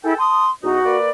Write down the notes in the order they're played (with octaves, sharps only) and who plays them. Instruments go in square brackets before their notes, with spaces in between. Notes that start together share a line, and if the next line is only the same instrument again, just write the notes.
[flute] E4 [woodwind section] G#4 A4 G5
[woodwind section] A5 D#6 [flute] C6
[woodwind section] E2 D#4 [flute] F#4
[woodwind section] A#3 B4 D5